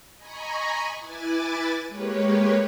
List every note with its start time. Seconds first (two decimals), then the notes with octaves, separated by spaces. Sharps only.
0.17 D#5 G#5 A#5 B5 C#6
1.00 E4 B4 G#5 D6 A6
1.88 G#3 A#3 G4 B4 C#5